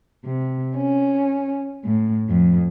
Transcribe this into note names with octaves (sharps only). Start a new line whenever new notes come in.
C3
C#4
A2
F2